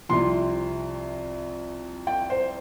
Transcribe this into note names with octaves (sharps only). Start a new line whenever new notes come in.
C2 C3 F3 C6
G5
C5